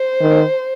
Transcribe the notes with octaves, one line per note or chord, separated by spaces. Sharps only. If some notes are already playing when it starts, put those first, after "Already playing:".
Already playing: C5
D#3